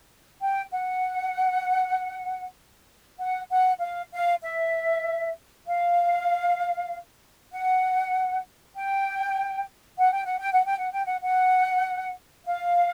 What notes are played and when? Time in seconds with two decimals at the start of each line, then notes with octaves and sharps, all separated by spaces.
0.41 G5
0.72 F#5
3.19 F#5
3.50 F#5
3.81 F5
4.12 F5
4.43 E5
5.66 F5
7.52 F#5
8.75 G5
9.99 F#5
10.12 G5
10.25 F#5
10.39 G5
10.52 F#5
10.65 G5
10.78 F#5
10.92 G5
11.05 F#5
11.23 F#5
12.46 F5